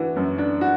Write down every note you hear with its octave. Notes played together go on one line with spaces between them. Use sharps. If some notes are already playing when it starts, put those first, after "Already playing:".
Already playing: E3 D4 F#4
F#2
D4
F#4